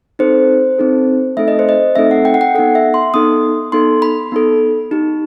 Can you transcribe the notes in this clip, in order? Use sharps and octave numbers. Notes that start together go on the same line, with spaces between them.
C4 D#4 A4 C5
C4 D#4 A4
A3 C4 D#4 A4 E5
D#5
C5
D#5
A3 C4 D#4 A4 E5
F#5
G5
F#5
G5
B3 D#4 A4 F#5
E5
C6
B3 D#4 A4 D#6
B3 D#4 A4 C6
B5
B3 D#4 A4
D#4 G4